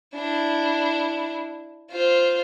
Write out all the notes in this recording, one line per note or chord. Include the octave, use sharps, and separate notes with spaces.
D4 E4
F4 C5